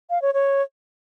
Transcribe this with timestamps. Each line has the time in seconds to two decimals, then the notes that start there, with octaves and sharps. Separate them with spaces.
0.10 F5
0.22 C#5
0.34 C#5